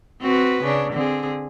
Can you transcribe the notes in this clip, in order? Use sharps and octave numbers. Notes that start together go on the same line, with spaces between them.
C4 F#4 B4
C#3 D4
D3 C4 G#4